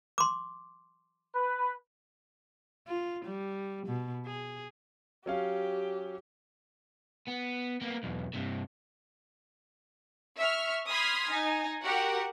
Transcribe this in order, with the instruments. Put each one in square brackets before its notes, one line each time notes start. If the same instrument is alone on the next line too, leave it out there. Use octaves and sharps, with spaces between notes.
[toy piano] C6 D6
[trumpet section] B4
[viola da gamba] F4
G3
B2
G#4
[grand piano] F#3 C#4 F5 [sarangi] G4
[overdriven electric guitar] B3
A#3 B3
B1 E2
G2 C3
[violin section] E5 C#6 F6
B5 C6 D#6 F6 G#6 B6
D#4 G#5
F#4 G4 A#4 F#5